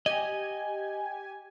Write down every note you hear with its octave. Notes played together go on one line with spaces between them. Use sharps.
G4 D#5 G#5